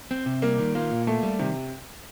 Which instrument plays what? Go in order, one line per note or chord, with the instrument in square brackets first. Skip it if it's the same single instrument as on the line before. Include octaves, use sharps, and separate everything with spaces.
[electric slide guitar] C4
C3
[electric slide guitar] G3 [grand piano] A#3
[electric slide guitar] D#3
[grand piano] A#3 [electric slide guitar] F4
[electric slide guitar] A#2
[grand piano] A3 [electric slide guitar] A#3
[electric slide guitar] G3
[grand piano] C3 [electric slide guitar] D#3